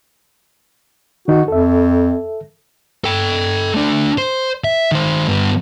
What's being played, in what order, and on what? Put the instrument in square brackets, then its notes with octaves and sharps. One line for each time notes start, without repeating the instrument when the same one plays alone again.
[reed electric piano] D#3 D#4 [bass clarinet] F#4
[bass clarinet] F2 [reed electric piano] A4 E5
[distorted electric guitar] A4 G5
A3 D4
C5
E5
D#3 C5
G2 B3